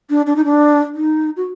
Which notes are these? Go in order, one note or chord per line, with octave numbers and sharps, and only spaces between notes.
D4
D4
D#4
D4
D#4
F#4